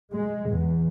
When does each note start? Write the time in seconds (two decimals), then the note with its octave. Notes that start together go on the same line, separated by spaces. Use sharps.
0.12 G#3
0.49 E2